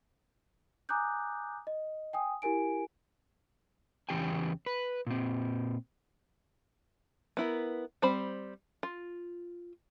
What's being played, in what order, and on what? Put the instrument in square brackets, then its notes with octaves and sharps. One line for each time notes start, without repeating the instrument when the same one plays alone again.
[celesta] G#5 A#5 D6 D#6 F#6 G6
D#5
G5 G#5 D#6
E4 G4 A#4 G#5 D7
[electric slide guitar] E2 C#3 E3 G4 G5 G#5
B4
A#2 C4
[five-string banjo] B3 E4 A#4
G3 C4 C5 B5
F4